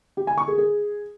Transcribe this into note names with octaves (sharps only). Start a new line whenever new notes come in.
G4
G#5
C#6
G#4
G#4